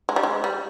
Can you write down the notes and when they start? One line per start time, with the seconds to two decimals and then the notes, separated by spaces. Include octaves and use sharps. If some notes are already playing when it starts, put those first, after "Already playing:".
0.09 G#3
0.16 G3
0.23 G#3
0.44 G3